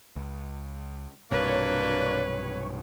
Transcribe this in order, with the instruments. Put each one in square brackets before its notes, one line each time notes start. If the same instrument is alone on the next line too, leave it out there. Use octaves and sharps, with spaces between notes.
[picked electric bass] C#2
[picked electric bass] B1 G2 C3 [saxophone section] F#3 A#3 D4 [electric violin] B4 [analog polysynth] C#5